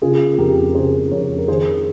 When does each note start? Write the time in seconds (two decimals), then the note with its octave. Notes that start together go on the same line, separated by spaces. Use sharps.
0.02 C#3 F4 G#4
0.38 F2 G4 A#4
0.75 C#3 G#4 C5
1.12 F2 A#4 C#5
1.38 A#4
1.48 D#3 G#4 C5